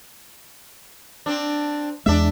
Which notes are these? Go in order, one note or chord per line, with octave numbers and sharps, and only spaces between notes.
C4 D4
E2 G#3 D4 E5